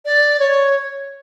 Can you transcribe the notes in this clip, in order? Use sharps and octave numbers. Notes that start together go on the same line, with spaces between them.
D5
C#5